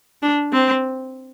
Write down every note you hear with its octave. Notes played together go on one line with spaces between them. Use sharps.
D4
C4